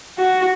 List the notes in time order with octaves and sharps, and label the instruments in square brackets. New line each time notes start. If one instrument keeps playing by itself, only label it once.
[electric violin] F#4